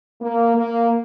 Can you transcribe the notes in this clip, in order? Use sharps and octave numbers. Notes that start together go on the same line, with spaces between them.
A#3
A#3